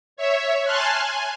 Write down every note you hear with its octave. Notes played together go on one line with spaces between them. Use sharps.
C#5 E5
G#5 A5 C6 F6 F#6
G#5